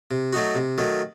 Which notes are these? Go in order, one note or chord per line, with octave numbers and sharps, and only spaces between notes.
C3
F#3 A3 D#4 F#4
C3
D#3 F#3 A3